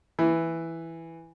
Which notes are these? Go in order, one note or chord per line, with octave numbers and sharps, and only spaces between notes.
E3